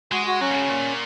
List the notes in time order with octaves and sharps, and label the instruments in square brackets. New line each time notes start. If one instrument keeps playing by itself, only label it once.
[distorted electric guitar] G#3 [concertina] F#4
[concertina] F#4
[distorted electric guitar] F#3 [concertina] C#4
[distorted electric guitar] A#2
C#3
A#2